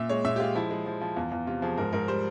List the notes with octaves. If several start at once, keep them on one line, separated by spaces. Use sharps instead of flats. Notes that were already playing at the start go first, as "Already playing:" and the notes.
Already playing: A#2 E5
G#3 C#5
A#2 E5
G4
G#3 F4
F3 E4
G#3
F3
F3
E2 F4
E2 F4
C3 F4
F3 G#4
G#2 A#4
G#2 A#4
G3 C5